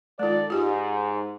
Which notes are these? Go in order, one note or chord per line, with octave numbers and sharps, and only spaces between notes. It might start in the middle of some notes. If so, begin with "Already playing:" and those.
D#3 G#3 F4 A4 D5
G#2 F4 G4